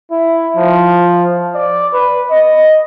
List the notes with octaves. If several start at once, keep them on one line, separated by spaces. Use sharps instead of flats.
E4
F3
D5
B4
D#5